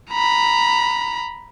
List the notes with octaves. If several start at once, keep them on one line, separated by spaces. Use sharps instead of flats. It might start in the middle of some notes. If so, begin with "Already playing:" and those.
A#5 B5